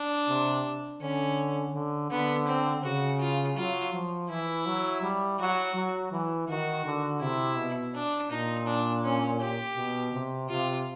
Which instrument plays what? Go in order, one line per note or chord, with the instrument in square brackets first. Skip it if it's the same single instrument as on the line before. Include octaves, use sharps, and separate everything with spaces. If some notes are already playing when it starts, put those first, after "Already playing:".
Already playing: [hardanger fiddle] D4
[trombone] C3
[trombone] D3 [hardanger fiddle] C#4
[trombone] D3
[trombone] D3 [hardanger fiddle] B3
[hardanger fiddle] C4
[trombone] C#3 [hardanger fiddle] F#4
[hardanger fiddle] F4
[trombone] F#3 [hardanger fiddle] F4
[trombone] F3
[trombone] E3 [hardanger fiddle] E4
[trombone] F#3
G3
[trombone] F#3 [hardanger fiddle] F#4
[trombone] F#3
E3
[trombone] D#3 [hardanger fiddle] F#4
[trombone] D3
[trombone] C3 [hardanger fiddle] E4
[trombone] B2
[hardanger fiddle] D4
[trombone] A#2 [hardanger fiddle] D#4
[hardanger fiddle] D4
C#4
G4
[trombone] B2
C3
[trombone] C3 [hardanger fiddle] F4